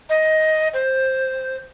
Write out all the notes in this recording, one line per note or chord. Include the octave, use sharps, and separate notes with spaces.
D#5
C5